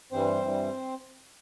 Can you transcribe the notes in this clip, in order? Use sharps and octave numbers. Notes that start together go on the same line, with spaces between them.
G2 E3 G3 C4 C5
G2 E3 G3